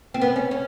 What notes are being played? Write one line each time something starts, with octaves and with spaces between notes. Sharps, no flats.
C4
B3
C#4
C#4